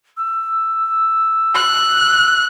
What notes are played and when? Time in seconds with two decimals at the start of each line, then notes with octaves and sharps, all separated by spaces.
0.17 E6
1.55 F#6